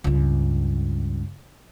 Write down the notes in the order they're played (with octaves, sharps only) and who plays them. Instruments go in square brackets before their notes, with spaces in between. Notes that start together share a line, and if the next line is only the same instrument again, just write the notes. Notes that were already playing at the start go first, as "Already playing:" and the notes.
[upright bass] C#2 G2